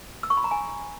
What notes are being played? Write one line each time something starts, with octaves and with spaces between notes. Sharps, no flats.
E6
C#6
B5
A#5
G#5